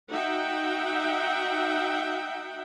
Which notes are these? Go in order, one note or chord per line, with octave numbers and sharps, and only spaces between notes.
D#4 F#4 E5 F#5 G5